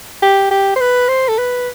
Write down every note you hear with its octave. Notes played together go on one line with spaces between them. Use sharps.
G4
G4
C5
B4
C5
A4
B4